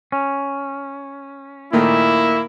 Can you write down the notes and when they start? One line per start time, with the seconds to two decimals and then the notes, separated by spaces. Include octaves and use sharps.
0.12 C#4
1.73 A#2 D#3 A3 A#3 E4